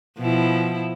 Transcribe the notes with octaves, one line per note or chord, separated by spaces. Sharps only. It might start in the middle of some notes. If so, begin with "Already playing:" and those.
B2 F3 E4